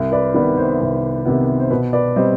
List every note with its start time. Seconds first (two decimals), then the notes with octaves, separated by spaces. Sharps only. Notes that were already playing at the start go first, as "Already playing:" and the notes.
Already playing: C2
0.12 B4 D5
0.34 C3 D#3 B3 B4 D5
0.57 C5
0.81 C2
1.26 C3 D#3 B3
1.60 C5
1.70 B2 B4
1.93 B4 D5
2.16 G3 C4 C5 D#5